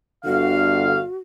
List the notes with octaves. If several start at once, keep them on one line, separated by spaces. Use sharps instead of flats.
G1 D3 F#4 F5